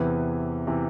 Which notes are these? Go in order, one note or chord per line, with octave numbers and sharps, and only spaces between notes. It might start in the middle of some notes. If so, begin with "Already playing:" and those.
Already playing: E2 C3 E3 B4
C3 E3